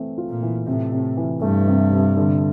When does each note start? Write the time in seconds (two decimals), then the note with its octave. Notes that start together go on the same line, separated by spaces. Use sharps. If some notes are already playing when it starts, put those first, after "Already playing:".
Already playing: E3 A3 C4
0.18 F4
0.29 A#2
0.43 E3
0.67 A2 C3
0.92 C3
1.17 E3
1.42 G2 A3
1.68 C3
1.91 C3
2.17 D3